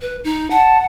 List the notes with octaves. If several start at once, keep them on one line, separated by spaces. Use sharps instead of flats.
B4
D#4
F#5 A5